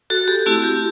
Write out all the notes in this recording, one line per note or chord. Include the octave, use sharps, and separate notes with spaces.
F#4 A4
G4
A3 C4 E4 F#4
G4